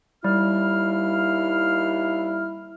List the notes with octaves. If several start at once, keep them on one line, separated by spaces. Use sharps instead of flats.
D#2 G3 E4 F5 F6